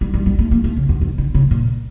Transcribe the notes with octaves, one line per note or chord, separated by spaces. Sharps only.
G3
G3
G3
A3
A#3
A3
C#3
E2
F2
D3
C#3
A#2